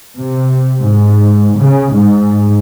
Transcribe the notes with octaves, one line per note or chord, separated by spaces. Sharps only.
C3
G#2
C#3
G#2